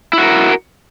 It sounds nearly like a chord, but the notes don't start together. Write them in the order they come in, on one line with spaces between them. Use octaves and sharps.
E4 F#4 A#4